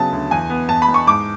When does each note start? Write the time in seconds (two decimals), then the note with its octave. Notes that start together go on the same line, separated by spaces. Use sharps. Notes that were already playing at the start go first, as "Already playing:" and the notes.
Already playing: C#3 F#3 B3 A5
0.12 D2
0.31 E2 G#5
0.50 B3
0.69 E2 A5
0.82 B5
0.89 E2
0.94 C#6
1.07 G#2 D6